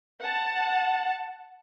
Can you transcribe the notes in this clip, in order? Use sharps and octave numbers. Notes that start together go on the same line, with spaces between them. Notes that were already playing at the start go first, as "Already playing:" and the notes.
F#5 A5